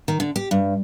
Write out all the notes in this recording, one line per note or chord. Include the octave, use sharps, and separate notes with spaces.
D#3
D3
G4
G2